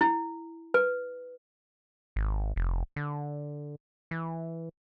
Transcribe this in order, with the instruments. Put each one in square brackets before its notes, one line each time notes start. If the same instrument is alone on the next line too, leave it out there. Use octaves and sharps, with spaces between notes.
[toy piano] E4
B4
[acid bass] G#1
F1
D3
E3